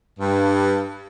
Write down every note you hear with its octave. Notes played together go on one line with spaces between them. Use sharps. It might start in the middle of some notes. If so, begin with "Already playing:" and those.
G2